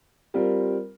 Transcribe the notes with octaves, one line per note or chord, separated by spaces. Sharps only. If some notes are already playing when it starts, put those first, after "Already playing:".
G3 C4 F4 A#4